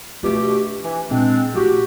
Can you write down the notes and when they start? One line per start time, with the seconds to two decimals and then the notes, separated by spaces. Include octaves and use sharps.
0.23 B2 A3 D4 F4 G4
0.83 E3
1.10 A#2 G#3 C4 D4
1.55 A1 F#4 G4